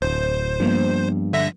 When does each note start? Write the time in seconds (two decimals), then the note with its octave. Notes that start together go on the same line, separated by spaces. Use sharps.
0.02 D1 C5
0.60 G2 F3 A#3 B3
1.33 D3 E5 A#6